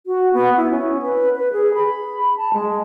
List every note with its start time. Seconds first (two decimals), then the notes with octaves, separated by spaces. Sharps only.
0.07 F#4
0.33 B3
0.57 E4
0.71 C#4
1.02 B4
1.36 B4
1.53 G#4
1.74 B5
2.37 A5
2.54 G#3